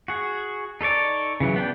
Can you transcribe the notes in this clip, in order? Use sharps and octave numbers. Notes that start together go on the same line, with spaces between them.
F#4 G#4
D#4 A4 C#5 D5
C#3 E3 F#3
B3 D4 G5